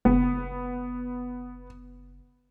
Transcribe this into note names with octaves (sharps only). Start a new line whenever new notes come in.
F#1 B3